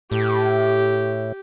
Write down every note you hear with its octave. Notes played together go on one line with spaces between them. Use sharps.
A2 G4